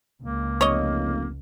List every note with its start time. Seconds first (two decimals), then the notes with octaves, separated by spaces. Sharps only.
0.22 C#2 A#3
0.61 F1 C#5 D#5